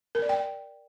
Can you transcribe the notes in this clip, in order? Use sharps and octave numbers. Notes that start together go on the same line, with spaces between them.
A#4
D5
G5